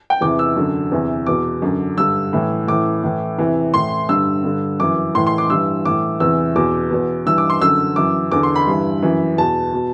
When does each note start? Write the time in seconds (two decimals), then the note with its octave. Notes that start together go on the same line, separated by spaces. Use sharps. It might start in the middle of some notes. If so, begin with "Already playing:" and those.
0.10 G5
0.21 E2 C3 E3 D6
0.39 E6
0.56 F#2 D3
0.92 E2 C3 E3
1.26 E2 B2 D6
1.62 F#2 D3
1.97 G2 D3 E6
2.33 A2 E3
2.68 A2 E3 D6
3.03 A2 E3
3.38 E2 C3 E3
3.73 A2 E3 C6
4.09 G2 D3 E6
4.44 G2 D3
4.80 F#2 E3 D6
5.15 A2 E3 C6
5.27 C6
5.38 D6
5.50 G2 E3 E6
5.85 A2 E3 D6
6.20 E2 C3 E3 E6
6.55 E2 B2 D6
6.91 E2 B2
7.26 G2 E3 E6
7.38 D6
7.50 C6
7.61 F#2 D3 E6
7.96 F#2 E3 D6
8.32 E2 D3 D6
8.43 C6
8.56 B5
8.67 G2 E3
9.02 F#2 E3
9.38 E2 B2 A5
9.73 B2